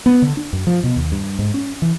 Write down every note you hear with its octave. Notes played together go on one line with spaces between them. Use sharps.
B3
D3
D4
F#2
F3
B2
D#2
G2
G#2
C#4
E3